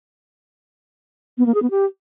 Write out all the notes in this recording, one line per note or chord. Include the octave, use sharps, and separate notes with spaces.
B3
A#3
G#4
B3
G4